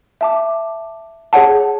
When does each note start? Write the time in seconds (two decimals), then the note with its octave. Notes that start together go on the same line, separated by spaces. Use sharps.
0.21 E5 A5 D6
1.33 G#4 C#5 F#5 A5